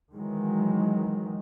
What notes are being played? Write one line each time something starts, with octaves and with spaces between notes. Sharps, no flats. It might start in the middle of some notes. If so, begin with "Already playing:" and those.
D#3 E3 F#3 G#3